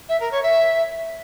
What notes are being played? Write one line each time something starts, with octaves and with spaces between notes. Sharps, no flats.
E5
A#4
C#5
E5